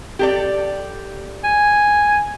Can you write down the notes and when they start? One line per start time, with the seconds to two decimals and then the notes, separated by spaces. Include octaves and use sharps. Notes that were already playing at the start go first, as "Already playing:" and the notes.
0.19 G4 A4 D5
1.44 G#5